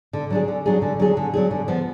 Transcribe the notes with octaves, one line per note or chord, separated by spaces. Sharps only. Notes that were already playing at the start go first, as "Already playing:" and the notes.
D3
F#3 D4 G#4
D3
F#3 D4 G#4
D3
F#3 D4 G#4
D3
F#3 D4 G#4
D3
F3 B3